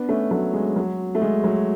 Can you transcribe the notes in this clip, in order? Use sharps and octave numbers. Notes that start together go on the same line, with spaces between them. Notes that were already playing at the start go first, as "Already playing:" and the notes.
Already playing: B3 D4
A3 C#4
F#3 A3
G#3
F#3
A3
G#3
F#3